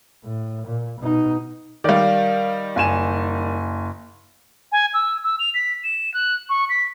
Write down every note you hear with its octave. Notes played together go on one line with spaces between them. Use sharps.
A2
A#2
B2 D#4
D#3 G3 D5 F5
F#1 G#5 E7
G#5
E6
E6
F7
B6
E7
F#6
C#6
B6